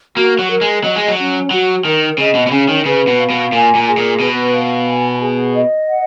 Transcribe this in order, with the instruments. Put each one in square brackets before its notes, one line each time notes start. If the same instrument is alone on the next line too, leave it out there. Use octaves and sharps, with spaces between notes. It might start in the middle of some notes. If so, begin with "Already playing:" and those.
[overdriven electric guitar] A#3 [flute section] F#4
[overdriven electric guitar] F#3
[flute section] A#4
[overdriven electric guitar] G#3
[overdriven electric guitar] F#3 [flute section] D#5
[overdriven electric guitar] G#3
F#3
[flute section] C#4
[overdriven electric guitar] F#3 [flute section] F#4
[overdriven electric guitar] D#3 [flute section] A#4
[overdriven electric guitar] C#3 [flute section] D#5
[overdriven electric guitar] B2
B2
[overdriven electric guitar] C#3 [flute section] C#4
[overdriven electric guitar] D#3
[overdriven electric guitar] C#3 [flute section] B4
[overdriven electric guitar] B2
[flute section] F5
[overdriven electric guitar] B2
[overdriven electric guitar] A#2 [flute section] G#5
[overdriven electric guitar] A#2
[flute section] G#4
[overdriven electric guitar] A#2
[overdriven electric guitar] B2 [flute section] B4
[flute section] F5
G#5
G#4
D#5
F#5